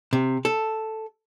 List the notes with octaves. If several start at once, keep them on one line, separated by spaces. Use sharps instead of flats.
C3
A4